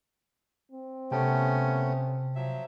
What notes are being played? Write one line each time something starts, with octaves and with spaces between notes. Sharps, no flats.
C4
C3 A3 B3 C#4 G5 A5
F3 F#3 E5